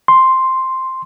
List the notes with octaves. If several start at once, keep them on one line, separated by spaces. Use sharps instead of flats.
C6